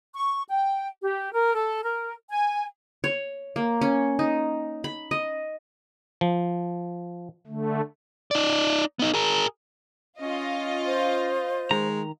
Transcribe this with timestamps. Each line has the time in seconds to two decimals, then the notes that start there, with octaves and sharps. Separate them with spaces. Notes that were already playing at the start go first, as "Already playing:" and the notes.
0.14 C#6
0.50 G5
1.03 G4
1.33 A#4
1.54 A4
1.83 A#4
2.29 G#5
3.04 C#5
3.56 A#3
3.81 C#4
4.19 D#4
4.84 B5
5.11 D#5
6.21 F3
7.47 D3 A3
8.31 D#4 D5
8.99 B3 D#4
9.14 G#4 A#4
10.21 C#4 F4 D#5
10.86 C5
11.71 D#3 G#3 A#5